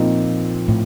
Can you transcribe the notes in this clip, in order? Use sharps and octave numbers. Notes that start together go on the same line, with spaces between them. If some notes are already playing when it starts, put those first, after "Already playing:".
Already playing: A#2 F3 C4 D#4
A2